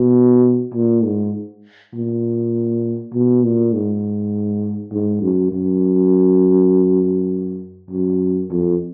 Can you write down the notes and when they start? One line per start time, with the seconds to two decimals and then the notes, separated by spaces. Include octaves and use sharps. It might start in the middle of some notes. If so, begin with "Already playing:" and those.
Already playing: B2
0.74 A#2
1.04 G#2
1.94 A#2
3.13 B2
3.43 A#2
3.73 G#2
4.92 G#2
5.22 F#2
5.52 F#2
7.91 F#2
8.51 F2